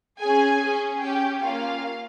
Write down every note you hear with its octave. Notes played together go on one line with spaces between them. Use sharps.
C#4 G#4 G#5
C#4 G#4
C#4 G4 G5
A#3 C#4 F4 F5